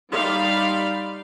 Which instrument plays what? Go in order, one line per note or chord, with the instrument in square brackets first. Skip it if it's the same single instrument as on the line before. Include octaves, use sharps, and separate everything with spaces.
[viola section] G3 D#4 D5 F5 B5 C6